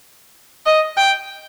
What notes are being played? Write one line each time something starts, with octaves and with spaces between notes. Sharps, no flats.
D#5
G5